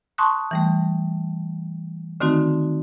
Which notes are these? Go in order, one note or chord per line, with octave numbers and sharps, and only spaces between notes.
A5 C6 C#6 D#6 F#6
E3 G3 A3
D3 D#3 A3 C4 D#4 F#4